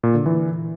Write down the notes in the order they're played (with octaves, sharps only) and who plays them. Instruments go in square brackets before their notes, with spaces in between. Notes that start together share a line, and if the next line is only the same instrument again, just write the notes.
[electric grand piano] A#2
D3
E3